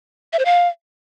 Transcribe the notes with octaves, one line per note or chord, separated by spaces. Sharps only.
E5
C5
F5